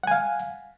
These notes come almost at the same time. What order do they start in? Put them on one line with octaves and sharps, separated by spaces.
F#5 G#5 F5